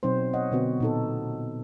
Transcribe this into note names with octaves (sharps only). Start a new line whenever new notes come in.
B2 F#3 C4 D#4 C5
C#5 D#5 F#5
B2 D3 B3 C4 F#4
A#2 D#4 A4